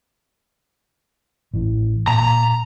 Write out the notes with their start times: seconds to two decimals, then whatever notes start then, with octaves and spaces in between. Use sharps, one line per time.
1.54 A1 E3
2.08 A#2 A#5